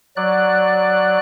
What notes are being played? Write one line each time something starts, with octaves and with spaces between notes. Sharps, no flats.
F#3 D5 F#6